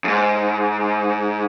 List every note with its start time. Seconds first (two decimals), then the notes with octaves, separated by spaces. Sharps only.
0.04 F2 G#2